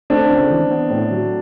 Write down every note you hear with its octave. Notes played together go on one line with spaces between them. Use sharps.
A3 C4 D4
C#2
E3
B3
A2
F#3